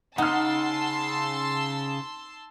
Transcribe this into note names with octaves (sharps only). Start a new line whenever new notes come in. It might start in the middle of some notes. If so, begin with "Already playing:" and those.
C#3 D#4 F#5 A5 C6 E6 F6